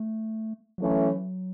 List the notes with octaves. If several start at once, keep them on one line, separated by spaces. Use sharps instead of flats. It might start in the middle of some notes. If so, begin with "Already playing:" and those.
Already playing: A3
E3 F#3 A3 C#4